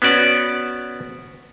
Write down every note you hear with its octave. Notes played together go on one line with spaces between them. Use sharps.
B3 C#4 F#4 D5